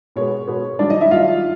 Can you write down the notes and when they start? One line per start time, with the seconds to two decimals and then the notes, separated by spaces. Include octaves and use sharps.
0.16 B2 G#3 B3 C#5
0.48 B2 G#3 B3
0.79 G2 D#3 F#3 D4 D5
0.90 D#4 D#5
1.01 E4 E5
1.11 G2 D#3 F#3 F4 F5